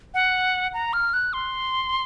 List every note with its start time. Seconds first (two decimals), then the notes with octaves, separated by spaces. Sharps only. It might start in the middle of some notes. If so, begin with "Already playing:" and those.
0.14 F#5
0.74 A#5
0.93 F6
1.13 F#6
1.33 C6